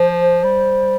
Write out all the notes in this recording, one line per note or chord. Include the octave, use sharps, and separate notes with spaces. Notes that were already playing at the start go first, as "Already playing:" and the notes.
Already playing: F3 C5
G3